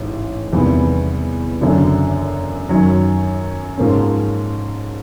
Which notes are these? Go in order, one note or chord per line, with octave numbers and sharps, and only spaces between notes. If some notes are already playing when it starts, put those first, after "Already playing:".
Already playing: A1 G#2
E2 C3 D#3 G3 B3
F#1 F#2 D3
F#2 D#3 F#3
G#2 F3 A#3 C#4